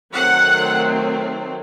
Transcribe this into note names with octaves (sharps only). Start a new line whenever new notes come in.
D#3 F#3 A3 C4 F#5